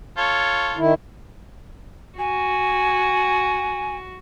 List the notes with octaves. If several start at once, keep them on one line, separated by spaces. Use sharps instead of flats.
F4 A4 C#5
D#3 E4
F#4 G#5